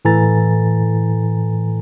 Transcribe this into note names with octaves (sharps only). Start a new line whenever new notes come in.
A2 E3 A4 G#5 A#5 A6